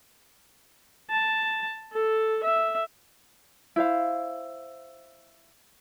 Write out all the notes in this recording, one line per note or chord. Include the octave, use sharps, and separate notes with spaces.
A5
A4
E5
E4 C5 F5